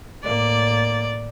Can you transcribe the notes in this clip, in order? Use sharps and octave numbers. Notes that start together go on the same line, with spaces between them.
A2 A#3 D5